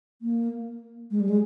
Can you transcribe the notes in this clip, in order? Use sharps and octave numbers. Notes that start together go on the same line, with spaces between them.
A#3
G#3
G3
G#3